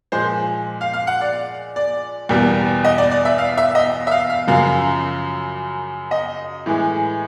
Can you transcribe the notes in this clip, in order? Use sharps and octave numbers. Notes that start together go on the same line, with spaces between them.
A#2 F3 G#3 C5
F5
F5
F#5
D5
D5
E2 B2 G3 A#3
D#5
D5
D5
E5
F5
E5
D#5
E5
F5
F5
F#2 C#3 F3 A#3 F5
D#5
A2 E3 G#3